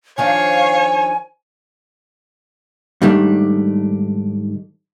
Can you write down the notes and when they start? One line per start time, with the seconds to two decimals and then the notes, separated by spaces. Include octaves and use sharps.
0.18 D#3 F3 D4 C#5 F5 G#5
3.02 G#2 D#3 G3 A3 D4